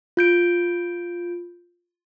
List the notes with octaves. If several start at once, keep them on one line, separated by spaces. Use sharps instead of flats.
F4 G6 D7